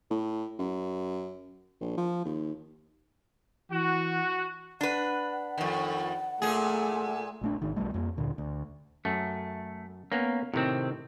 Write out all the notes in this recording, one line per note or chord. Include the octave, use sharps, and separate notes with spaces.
A2
F#2
A#1
F3
D#2
E3 F#4
D4 B4 F#5
F2 D#3
A#2 A3 G#4
A#1 A3 D4
G#1 D#3
B1 F#2 G3 A3
F2 A3 A#3
D2 A#2 D3
D2
F#2 A3
A#3 B3 C#4
A2 C3 D#3 C4